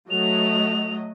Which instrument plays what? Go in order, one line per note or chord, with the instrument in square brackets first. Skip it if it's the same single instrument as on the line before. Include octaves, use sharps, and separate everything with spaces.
[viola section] F#3 A3 D#5 [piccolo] F7